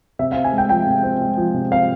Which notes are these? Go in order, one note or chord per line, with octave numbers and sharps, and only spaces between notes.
C3 E5
C4 F5
G#5
G#3
G5
F3 G5
C3
C4
G#3
F3
C3
C4 F5